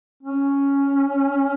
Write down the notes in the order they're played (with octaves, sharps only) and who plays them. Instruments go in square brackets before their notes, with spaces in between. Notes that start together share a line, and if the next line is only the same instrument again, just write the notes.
[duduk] C#4